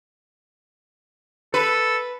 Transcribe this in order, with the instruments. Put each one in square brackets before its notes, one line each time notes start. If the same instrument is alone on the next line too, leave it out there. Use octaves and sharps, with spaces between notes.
[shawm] A4 [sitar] B4